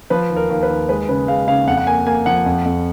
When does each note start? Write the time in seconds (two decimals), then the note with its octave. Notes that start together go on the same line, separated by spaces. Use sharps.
0.10 F3 B4
0.30 D#2
0.36 A#4
0.50 D#2
0.63 B4
0.69 D#2
0.89 G#3 B4
1.08 C#3 B4
1.28 G#3 F5
1.48 C#3 F5
1.67 F2 F#5
1.77 F#5
1.87 A#3 G#5
2.06 A#3 G#5
2.26 F3 F#5
2.46 F2
2.65 F2